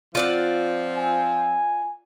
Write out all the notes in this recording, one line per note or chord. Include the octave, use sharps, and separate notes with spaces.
F3 C4 F4 D5 F#5
G#5